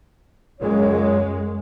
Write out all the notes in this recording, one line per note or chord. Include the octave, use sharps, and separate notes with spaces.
C#2 F#2 A#2 G#3 C#5